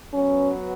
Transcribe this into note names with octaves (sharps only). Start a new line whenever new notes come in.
F#3 B3 C#4 F#4 B4